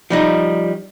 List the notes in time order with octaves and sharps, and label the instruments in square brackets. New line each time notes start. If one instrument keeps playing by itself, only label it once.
[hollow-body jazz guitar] F3 G3 D#4